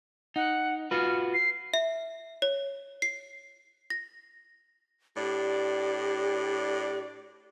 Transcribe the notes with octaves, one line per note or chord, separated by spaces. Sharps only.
D#4 F#5
F4 F#4 B4 F6
C7
E5
C#5
C7
A#6
A2 D4 G4 D5